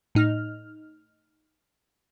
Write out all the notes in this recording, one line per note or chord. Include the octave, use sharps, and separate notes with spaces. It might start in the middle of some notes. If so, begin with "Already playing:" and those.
A2 D#4 F6